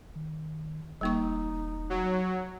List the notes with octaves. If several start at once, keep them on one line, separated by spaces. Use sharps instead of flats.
D#3
E1 G3 A#3 D#4 C#6
F#3